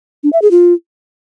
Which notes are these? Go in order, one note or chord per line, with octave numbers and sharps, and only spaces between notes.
D4
E5
G#4
F4